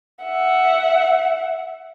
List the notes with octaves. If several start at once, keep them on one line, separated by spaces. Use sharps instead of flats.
E5 F#5